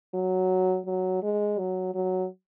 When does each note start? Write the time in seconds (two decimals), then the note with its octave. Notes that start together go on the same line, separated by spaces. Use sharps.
0.14 F#3
0.86 F#3
1.23 G#3
1.58 F#3
1.94 F#3